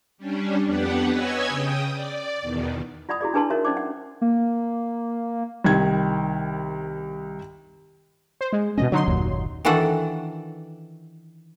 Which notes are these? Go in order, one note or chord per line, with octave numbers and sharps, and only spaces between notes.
G3 C#4 D4
F2 B3 D4 G4 B4 F#5
B4 C#5 D#5 G#5 E6 G#6
C#3 G5 D#6
D5
E2 B2 D#3
F4 D5 F#5 B5 D#6
E4 F#4 G#4 D5
D4 G#4 B4 A5 C6
D#4 F#4 A#4 C#5 E5 C6
C#4 D#4 C5 D5 D6
F#5
A#3
C2 D#3 G#6
C5
G#3
B2 F3 C#4 D#5
D3 F#3 D#4 C6
F#1 D#2 A#2
D#3 E3 D4 F#4 A4 F#5